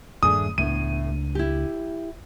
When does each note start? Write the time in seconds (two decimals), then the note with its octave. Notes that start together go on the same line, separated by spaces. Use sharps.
0.23 D#1 G2 A3 D4 G#4 D#6
0.58 C#2 A2 A3 B3 D4 D#7
1.35 E4 G4